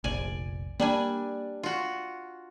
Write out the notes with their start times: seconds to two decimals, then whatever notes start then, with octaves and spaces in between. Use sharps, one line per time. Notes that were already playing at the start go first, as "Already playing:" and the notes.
0.04 F1 A#1 D5 G#5
0.80 G3 A#3 D4 G#5
1.63 F4 F#4